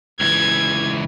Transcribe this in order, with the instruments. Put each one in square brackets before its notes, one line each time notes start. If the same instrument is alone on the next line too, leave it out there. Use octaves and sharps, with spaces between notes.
[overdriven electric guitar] C#2 E3 [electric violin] G#6